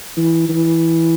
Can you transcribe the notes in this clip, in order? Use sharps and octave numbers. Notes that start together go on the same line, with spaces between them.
E3
E3